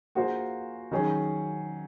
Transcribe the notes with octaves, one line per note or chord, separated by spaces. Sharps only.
A#3 F4 F#4 G#4 C5
D#3 F#3 C#4 G#4